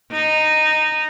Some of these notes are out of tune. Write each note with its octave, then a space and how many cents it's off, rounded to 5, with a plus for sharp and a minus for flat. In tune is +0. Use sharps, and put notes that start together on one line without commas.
D#4 -10